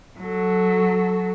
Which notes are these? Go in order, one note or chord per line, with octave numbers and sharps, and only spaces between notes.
F#3 A4